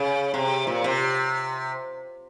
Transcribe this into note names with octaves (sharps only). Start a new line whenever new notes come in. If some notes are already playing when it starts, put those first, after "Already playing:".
Already playing: C#3
C3
A#2
C3